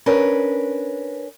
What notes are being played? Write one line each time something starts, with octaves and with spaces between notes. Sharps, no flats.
C#4 D4 A#4 B4